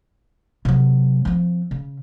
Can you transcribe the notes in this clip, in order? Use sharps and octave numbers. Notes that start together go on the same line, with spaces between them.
C3 F#3
F3 C4
C#3